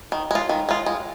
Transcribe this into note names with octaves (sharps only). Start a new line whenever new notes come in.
D#3
G#3 F4
D#3
G#3 F4
G#3